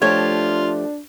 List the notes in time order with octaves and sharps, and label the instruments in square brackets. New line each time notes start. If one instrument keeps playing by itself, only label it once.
[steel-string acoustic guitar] F3 A3 G4 [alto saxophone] D4 [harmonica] F4 [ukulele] C#5